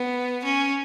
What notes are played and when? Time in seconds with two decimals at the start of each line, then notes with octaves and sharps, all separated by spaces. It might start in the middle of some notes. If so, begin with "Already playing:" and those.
Already playing: B3
0.44 C#4